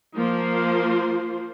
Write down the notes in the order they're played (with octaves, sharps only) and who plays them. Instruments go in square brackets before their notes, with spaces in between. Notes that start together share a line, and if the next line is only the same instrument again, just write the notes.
[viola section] F3 A#3 F4 C5